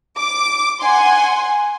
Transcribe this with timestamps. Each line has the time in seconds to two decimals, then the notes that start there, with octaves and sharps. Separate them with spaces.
0.17 D6
0.81 F#5 G#5 C6